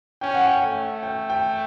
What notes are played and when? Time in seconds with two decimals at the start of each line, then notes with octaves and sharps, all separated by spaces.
0.21 C#4 G5
0.34 F#5
0.47 G5
0.62 A3
1.03 G5
1.30 G5